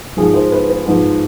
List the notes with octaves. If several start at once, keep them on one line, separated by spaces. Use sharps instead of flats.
G#2 F3 G#4
C5
B4
B4
G#2 F3 B4